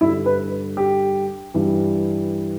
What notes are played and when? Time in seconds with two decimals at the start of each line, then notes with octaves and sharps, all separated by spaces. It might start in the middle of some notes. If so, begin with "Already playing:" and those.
0.01 G2 D3 G3 E4
0.26 B4
0.77 G4
1.54 G2 E3 G3